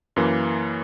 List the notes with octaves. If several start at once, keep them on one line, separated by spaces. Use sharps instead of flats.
F#2 E3 A#3